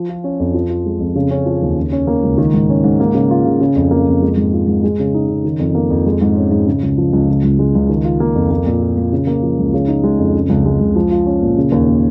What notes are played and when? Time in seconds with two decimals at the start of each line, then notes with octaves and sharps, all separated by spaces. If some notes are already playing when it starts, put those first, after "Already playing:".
Already playing: F3
0.09 F4
0.24 C#4
0.39 F2
0.54 F3
0.69 F4
0.86 G#3
1.00 F2
1.15 C#3
1.31 C#4
1.46 F3
1.62 D#2
1.77 C#3
1.92 C#4
2.07 A#3
2.23 C#2
2.38 D#3
2.54 G#2
2.69 C#4
2.84 G#2
3.00 A#3
3.14 C#3
3.30 F4
3.45 C#3
3.61 C#3
3.76 F2
3.91 A#3
4.07 F2
4.22 G#3
4.37 G#2
4.53 F4
4.67 G#2
4.84 G#3
4.99 C#3
5.14 D#4
5.29 C#3
5.44 D#3
5.59 F2
5.75 A#3
5.90 F2
6.06 G#3
6.21 G#2
6.37 C#4
6.51 G#2
6.67 C#3
6.83 C#2
6.98 F3
7.13 C#2
7.28 C#3
7.43 C#2
7.59 G#3
7.75 C#2
7.89 D#3
8.04 F4
8.20 A#3
8.35 F2
8.51 A#3
8.66 A#2
8.82 F4
8.97 A#2
9.12 C#3
9.27 A#3
9.43 F3
9.58 C#2
9.74 C#3
9.88 D#4
10.04 G#3
10.19 F2
10.35 C#3
10.49 C#2
10.65 G#3
10.80 C#2
10.95 F3
11.11 F4
11.26 C#4
11.42 A#2
11.58 C#3
11.72 D#2
11.88 A#3